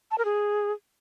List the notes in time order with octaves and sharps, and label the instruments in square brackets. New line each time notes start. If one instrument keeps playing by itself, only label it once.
[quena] A5
A#4
G#4